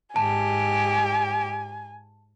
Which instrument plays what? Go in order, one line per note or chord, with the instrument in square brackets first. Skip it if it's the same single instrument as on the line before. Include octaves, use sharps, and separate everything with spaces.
[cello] G#2 G4 [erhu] G#5 [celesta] A5